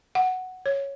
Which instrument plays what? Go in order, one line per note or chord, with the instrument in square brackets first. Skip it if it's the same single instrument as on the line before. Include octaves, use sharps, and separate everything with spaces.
[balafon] F#5
C#5